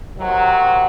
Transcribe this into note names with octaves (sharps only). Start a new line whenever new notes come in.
C3 D#3 F#3